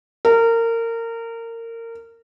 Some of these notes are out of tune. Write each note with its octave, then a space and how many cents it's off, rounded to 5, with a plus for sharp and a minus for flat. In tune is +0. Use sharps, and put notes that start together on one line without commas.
A#4 -25